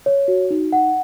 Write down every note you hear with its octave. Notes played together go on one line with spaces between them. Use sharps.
C#5
F#4
D#4
F#5